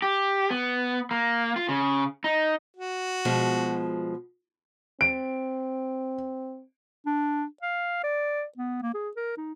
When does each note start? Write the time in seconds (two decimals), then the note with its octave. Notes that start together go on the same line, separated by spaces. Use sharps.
0.02 G4
0.50 B3
1.11 A#3
1.56 F4
1.69 C#3
2.24 D#4
2.77 F#4
3.25 B2 F3 G#3
5.01 C4 D7
7.06 D4
7.63 F5
8.04 D5
8.58 B3
8.82 A#3
8.94 G#4
9.16 A#4
9.37 D#4